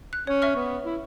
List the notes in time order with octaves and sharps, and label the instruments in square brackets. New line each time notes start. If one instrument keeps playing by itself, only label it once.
[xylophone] F#6
[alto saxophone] C#4 [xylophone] C#5
[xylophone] E5 C#6 F6
[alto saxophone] B3
E4